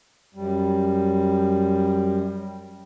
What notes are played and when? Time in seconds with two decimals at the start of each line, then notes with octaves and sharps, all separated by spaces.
0.35 F#2 G3